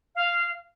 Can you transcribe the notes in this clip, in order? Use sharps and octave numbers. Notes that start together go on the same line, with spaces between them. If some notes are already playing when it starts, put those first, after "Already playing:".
F5